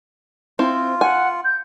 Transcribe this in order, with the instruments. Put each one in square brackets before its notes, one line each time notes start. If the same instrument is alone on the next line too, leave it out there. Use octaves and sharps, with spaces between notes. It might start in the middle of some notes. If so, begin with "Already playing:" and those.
[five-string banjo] C4 E4 [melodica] F4
[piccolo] F#5 [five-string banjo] G#5
[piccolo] G6